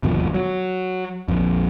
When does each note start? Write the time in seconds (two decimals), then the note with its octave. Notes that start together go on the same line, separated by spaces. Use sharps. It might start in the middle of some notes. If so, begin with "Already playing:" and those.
0.03 G1 D#2 B2 F3
0.34 F#3
1.28 A#1 F2